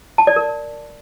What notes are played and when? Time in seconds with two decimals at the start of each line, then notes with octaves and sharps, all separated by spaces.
0.18 A5
0.27 D5
0.36 A#4